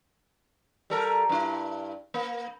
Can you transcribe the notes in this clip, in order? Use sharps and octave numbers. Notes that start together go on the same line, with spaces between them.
G3 A4 A#4
G2 E4
A#3